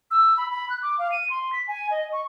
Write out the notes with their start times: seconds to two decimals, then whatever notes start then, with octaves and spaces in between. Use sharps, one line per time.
0.11 E6
0.37 B5
0.51 B5
0.70 F#6
0.83 D6
0.99 F5
1.12 D#7
1.30 C6
1.53 B6
1.68 G#5
1.91 D#5
2.13 C#6